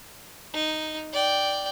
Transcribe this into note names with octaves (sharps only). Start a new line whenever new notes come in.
D#4
D5 G5